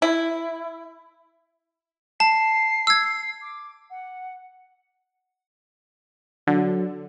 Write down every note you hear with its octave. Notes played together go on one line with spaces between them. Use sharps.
E4
A5 C7
E6 G#6
D6
F#5
D3 F#3